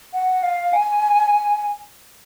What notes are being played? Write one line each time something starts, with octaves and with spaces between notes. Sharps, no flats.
F#5
F5
G#5